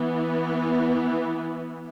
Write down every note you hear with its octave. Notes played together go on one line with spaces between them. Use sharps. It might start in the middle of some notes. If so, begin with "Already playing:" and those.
Already playing: E3 B3